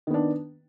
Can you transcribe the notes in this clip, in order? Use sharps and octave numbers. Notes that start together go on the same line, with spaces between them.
D#3 B3 D4